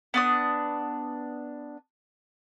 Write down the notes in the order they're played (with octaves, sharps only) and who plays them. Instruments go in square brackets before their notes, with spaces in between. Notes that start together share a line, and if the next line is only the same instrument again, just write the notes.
[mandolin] B3 D4 D#6